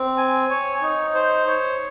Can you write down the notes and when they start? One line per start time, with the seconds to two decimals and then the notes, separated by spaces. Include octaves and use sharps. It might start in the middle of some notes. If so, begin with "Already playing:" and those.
Already playing: C4
0.17 G#5
0.50 C#5
0.82 D#4
1.14 C5
1.47 C#5